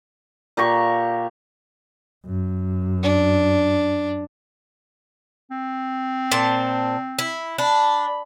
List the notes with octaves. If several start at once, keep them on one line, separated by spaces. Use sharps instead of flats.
A#2 G4 A#5 C#6
F#2
D4
C4
A#2 C5 A5
E4
D4 B5